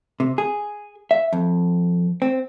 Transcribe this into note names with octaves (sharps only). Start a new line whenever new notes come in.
C3
G#4
E5
F2
C4